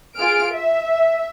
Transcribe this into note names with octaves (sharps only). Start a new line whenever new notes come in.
F4 G#4 F6 D7
E5